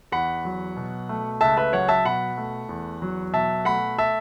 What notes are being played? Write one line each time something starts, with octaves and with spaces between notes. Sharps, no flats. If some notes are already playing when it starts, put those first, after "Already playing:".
E2 F#5 B5
F#3
B2
A3
C#2 E5 A5
B4 E5
F#3 C#5 F#5
E5 A5
B2 F#5 B5
A3
E2
F#3
B2 E5 A5
A3 F#5 B5
E5 A5